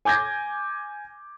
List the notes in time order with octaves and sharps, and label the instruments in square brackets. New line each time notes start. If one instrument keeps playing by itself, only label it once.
[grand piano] G#5 D6 G6 G#6 A#6